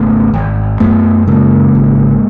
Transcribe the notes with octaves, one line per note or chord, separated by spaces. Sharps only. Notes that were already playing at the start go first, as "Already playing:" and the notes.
Already playing: G#1 C#3 A3 B3
G#1
F#2 A3 B3
C#3 G#3 A#3
G#1